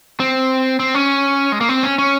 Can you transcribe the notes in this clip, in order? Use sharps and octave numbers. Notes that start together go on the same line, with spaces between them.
C4
C4
C#4
G#3
A#3
C4
C#4
C#4